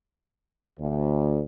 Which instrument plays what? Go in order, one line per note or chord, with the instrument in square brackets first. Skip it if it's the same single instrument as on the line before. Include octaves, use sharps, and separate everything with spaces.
[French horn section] D2